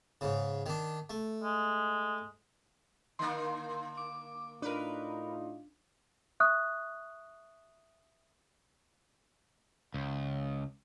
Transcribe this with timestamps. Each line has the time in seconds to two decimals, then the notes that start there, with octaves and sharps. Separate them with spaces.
0.21 G#2 C#3
0.66 D#3 D4
1.10 A3
1.43 G#3
3.19 D3 A#3 C6
3.97 D6
4.62 A2 D4 D#4 F4 A#4 B4
6.40 E5 C#6 D#6 F#6
9.94 C#2